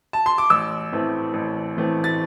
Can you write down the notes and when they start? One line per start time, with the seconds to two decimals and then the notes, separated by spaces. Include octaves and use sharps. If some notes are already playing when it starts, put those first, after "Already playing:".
0.13 A5
0.26 C6
0.38 D6
0.50 A1 E6
0.92 A2 E3 A3 C4
1.34 A1
1.76 A2 E3 A3 C4
2.04 A6